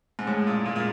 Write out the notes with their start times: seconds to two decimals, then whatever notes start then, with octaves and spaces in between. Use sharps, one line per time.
0.19 G#2
0.27 A2 G#3
0.47 A#2
0.66 A#2 G#3
0.76 A#2